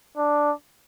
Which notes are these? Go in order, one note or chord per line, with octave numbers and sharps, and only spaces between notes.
D4